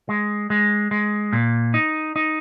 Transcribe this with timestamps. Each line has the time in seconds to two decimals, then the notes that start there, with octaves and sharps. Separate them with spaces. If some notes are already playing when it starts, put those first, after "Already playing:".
0.09 G#3
0.50 G#3
0.91 G#3
1.33 A#2
1.74 D#4
2.16 D#4